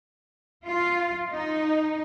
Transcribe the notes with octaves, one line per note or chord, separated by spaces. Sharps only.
F4
D#4